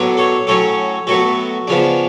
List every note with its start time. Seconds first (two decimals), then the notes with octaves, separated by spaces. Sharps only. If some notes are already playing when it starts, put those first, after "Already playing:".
Already playing: A2 F#3 B3 D4
0.17 A4 C#5
0.47 A2 F#3 C#4 A4 C#5
1.07 A2 F#3 B3 F#4 A4
1.68 C#3 F3 B3 D4